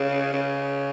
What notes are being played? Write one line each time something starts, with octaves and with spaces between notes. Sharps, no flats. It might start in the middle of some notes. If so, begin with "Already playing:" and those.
Already playing: C#3
C#3